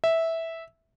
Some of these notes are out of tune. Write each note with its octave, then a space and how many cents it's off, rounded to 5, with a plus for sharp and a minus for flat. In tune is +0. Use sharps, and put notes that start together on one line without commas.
E5 -10